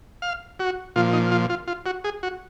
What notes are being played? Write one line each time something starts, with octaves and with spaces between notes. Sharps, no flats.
F5
F#4
A#2 F3 F4
D#4
F4
F4
F4
F#4
G#4
F#4